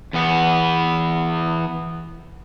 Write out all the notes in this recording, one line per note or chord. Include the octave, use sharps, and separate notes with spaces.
E2 B3